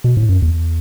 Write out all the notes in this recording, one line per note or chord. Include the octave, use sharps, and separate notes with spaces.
B2
A2
F#2
E2